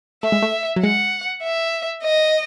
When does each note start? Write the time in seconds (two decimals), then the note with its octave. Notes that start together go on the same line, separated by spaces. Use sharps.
0.23 A3 E5
0.32 G#3
0.42 A3
0.76 F#3
0.83 G#3 F#5
1.43 E5
2.03 D#5